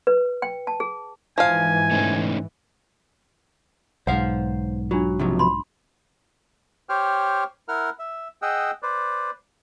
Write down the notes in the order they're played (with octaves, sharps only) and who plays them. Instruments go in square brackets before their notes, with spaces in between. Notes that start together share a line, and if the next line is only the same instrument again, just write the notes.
[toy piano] B4
G5
A5
G#4
[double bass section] G#2 E3 [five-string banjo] F3 F5 [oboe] G#5
[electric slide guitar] A3 C#4 D#4
[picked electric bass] B1 G#2 [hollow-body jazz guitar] C5 F5 [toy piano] F#5
[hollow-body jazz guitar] F#3 [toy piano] D4 F4
[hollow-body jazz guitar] C3 F3 F#3
[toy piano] B5 C6
[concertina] G4 C5 C#5 G5 F6
E4 A#4 F#5 F6
E5
G#4 D#5 F#5 G5 E6
B4 C5 D5